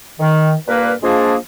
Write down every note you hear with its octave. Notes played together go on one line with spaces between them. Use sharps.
D#3
G2 A#2 A#3 A#4 B4
F3 G#3 A#3 D4 F4 G#4